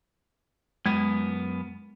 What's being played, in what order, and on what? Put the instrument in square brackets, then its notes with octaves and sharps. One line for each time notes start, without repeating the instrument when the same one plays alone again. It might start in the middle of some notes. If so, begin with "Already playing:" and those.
[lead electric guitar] F#2 B3 [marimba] G#3